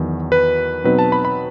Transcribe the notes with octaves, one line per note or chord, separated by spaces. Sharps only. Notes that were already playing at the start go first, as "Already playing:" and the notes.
Already playing: E2 D#3 F#3
B4
B2 F#3 C4 D#4 B4
A5
B5
B5